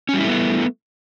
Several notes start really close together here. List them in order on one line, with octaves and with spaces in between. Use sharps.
C#4 G3 E4 A3 B3